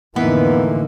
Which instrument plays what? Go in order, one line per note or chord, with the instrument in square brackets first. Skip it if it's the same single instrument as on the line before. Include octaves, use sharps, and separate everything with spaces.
[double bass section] F2 A2 D3 [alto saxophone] E3 [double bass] A#3 D#4 [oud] B3